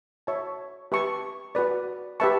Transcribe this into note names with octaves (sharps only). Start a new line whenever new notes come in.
F#4 C#5 E5 A5 C#6
G4 B4 E5 A5 C#6
F#4 B4 D5
G4 B4 E5 A5 C#6